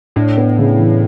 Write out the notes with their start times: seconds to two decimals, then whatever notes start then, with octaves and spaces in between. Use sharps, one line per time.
0.16 A2 D4
0.37 B3
0.59 C#3
0.79 E3